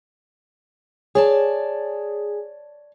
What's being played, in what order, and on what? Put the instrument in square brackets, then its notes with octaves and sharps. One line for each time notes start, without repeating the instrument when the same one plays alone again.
[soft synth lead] G#4 [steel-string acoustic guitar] C#5 D5 A5